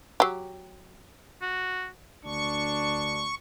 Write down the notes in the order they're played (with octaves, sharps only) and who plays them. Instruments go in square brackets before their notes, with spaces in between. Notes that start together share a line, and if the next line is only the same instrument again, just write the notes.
[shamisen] F#3 G4
[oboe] F#4
[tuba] D2 [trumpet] D4 [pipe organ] C#6